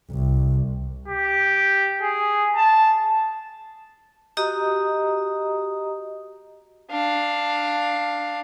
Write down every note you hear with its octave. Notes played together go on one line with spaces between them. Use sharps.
C2
G4
G#4
A5
F#4 G4 D#5 A#5 D#6
D4 F5